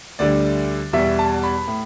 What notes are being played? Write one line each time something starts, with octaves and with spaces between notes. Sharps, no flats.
D2 D3 G3 D5
E2 B2 G3 E5
A5
B5
A2